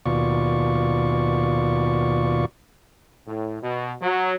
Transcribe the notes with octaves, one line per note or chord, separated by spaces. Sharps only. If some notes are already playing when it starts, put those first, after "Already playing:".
D#2 B2 F4 D5 C#6
A2
B2
F#3